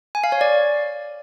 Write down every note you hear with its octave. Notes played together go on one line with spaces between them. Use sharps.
G#5
F5
C#5
D5